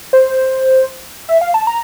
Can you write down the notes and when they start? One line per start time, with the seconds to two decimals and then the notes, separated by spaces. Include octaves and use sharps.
0.13 C5
1.29 E5
1.41 F5
1.54 A5
1.67 A#5